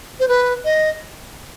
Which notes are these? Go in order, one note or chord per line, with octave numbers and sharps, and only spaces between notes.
C5
B4
D#5